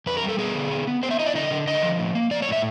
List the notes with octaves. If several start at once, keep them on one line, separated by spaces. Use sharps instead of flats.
F2 B4
A#4
G3
A4
B3 G#4
D3
B3
B3
B3 C5
E5
E4 D#5
D5
D3 D#5
D3
D3 D#5
F3
A2
A#3
A#3 D5
C#5
A2 E5